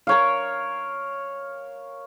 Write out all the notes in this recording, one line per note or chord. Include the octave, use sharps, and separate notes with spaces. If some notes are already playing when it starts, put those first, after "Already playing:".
A#4 C#5 F5